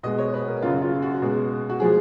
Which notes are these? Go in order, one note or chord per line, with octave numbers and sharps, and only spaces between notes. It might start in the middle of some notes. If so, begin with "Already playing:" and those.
B2 G#3 D#5
C#5
B4
A#4
F#2 C#3 F#3 F4
F4
F#4
B2 G#3
F#4
F3 G#3 G#4